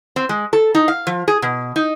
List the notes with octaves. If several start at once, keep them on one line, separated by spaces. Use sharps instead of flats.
C4
G#3
A4
D#4
F5
F3
G#4
B2
D#4